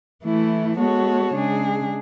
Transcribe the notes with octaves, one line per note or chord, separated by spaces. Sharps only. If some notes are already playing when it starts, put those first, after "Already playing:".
E3 A3 E4
G#3 B3 F#4 A4 C#5
C#3 G#3 D4 G#4